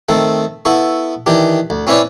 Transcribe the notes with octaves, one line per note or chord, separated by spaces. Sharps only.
D#3 A3 C4 A4
B3 E4 A4 C#6
D#3 E3 D4 G4
D2
C4 C#4 E4 B4 C#5 D5